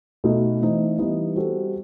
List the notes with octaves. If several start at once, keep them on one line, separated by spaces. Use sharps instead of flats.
B2 A3 D#4 F#4 A4
E3 A3 C4 D#4
E3 G3 B3 D#4
G3 C4 F#4 A4